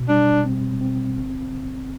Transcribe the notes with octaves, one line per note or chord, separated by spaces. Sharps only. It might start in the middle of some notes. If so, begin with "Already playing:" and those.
Already playing: B2
G3 D4
C4
C4
G1
G1